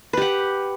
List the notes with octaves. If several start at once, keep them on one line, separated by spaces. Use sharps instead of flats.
G4 B4 F#5